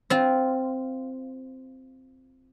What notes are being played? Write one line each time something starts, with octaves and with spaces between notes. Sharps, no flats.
C4 F4